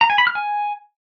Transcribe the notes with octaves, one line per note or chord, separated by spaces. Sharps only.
A#5
G#5
B5
F6
G#5